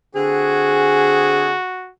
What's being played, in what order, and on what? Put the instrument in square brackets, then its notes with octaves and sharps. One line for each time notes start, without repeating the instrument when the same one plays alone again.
[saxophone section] D3 C4 G#4 [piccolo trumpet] F#4